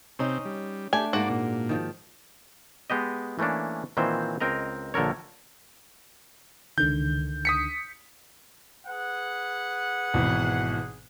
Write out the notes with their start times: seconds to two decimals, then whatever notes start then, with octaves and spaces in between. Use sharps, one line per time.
0.19 C3 C4 C#4 D#4
0.45 G3
0.93 A3 D4 G4 G#5
1.13 G#2 A#3 D4 F#4 D5
1.30 A#2
1.69 D#3 F3
2.90 G#3 B3 G4 D#5
3.39 E3 A3 A#3 C#4 D4
3.97 A#2 D#3 E3 C4 C5
4.40 C#2 C4 A#4 D#5 A#5
4.94 A#1 D3 A4 A#4 C#5
6.78 C#2 D3 D#3 G6
7.45 D#6 B6 C#7
8.87 G#4 B4 F#5
10.14 G#1 B2 E3